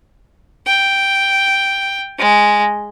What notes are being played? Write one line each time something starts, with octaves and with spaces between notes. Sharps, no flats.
G5
G#3